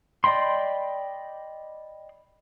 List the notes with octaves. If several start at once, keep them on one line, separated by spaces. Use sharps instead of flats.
D5 D#5 G5 B5 C6